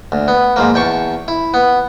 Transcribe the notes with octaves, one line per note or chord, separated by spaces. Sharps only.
D2
B3
G#2 F3 A#3
E2 G5 A5 C#6
E4
B3